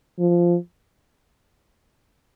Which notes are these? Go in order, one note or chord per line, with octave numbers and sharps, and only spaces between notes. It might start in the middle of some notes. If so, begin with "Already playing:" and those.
F3